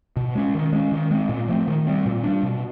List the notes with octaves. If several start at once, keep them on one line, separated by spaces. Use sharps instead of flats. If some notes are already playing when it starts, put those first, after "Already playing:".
B2
G#3 C#4
D#3
G#3 C#4
D#3
G#3 C4
A#2
F3 A3 C4
D#3
G3 C4
A#2
G3 A#3 D4
B2